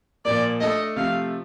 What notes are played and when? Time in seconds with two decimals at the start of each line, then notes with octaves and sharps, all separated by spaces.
0.25 A#2 F3 A#3 D5
0.60 A3 D4 A4 D#5
0.96 C3 F3 A3 F5